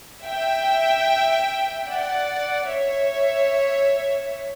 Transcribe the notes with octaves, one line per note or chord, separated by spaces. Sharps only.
E5 G5
D5 F#5
C#5 E5